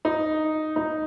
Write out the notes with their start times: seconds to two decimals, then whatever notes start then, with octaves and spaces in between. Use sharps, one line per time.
0.05 D#4
0.76 D#4